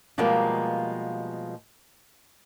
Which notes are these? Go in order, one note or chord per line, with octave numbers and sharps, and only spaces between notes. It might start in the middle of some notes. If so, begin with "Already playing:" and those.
B2 F3 G3 G#3 A#3